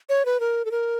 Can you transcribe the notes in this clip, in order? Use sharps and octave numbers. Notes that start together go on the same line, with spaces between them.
C#5
B4
A#4
A4
A#4